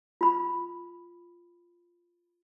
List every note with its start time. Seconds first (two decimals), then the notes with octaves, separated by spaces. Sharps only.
0.21 F4 B5